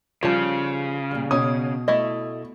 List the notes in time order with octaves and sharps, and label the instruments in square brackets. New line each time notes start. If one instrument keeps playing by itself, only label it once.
[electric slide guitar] C#3 [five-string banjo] F3 G3 A5 [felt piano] F4
[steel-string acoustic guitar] A#2 G3
[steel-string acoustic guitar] B2 [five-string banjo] C#4 [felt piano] D#6
[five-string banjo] A3 E4 D#5